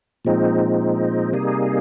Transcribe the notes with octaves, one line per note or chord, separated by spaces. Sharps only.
A#2 F3 G#3 C4 D#4
C3 G3 A#3 D#4 G#4